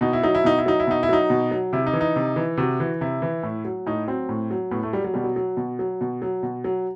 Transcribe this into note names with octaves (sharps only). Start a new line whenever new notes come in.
B2 D#4
E4
F#3 D#4
E4
B2 D#4
E4
F#3 D#4
E4
B2 D#4
E4
F#3 D#4
B2
F#3
C3 E4
D#4
E3
D#4
C3
E3
C3 F#4
E3
C3 E4
E3
A2
F#3
A2 D#4
F#3 C4
A2
F#3
A2 B3
A3
F#3 G3
F#3
B2 G3
F#3
F#3
B2
F#3
B2
F#3
B2
F#3